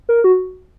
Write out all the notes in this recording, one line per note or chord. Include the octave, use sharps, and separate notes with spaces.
A#4
F#4